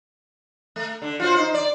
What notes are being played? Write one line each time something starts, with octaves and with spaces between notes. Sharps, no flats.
A3
D3
F4 F#4 C5
D#4 C5
D5